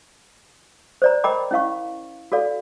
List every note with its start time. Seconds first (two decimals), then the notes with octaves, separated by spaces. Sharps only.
1.02 C5 D5 A#5
1.24 A#4 D#5 G5 A#5 B5 D6
1.51 C#4 E4 F5 C#6
2.32 F#4 A4 D5 F5